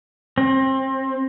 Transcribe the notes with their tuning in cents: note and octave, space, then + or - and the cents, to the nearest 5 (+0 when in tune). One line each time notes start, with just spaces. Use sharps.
C4 +30